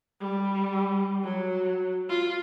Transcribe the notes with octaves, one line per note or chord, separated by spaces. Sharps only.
G3
F#3
F4